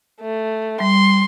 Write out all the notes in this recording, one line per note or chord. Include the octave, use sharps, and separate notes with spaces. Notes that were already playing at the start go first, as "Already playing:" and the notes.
A3
G3 C6